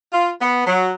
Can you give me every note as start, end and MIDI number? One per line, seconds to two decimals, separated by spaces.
0.13 0.31 65
0.41 0.64 59
0.67 0.92 54